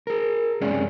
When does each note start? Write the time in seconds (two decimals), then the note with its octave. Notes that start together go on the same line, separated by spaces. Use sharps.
0.07 G#4 A#4
0.61 C2 F#2 G#3 C#4 G#4 D5